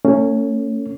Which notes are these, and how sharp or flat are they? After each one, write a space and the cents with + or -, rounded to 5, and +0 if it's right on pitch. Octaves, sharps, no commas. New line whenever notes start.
A3 +45 C#4 +0